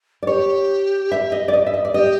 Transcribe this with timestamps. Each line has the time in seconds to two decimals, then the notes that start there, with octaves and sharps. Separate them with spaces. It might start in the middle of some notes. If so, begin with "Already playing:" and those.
0.23 D5
0.27 G4 C#5
1.12 E5
1.32 D#5
1.48 D5
1.53 D#5
1.66 E5
1.74 D#5
1.85 D5
1.94 G4 D#5